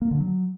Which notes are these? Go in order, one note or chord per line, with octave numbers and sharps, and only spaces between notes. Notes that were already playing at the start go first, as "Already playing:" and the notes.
A#3
D3
F#3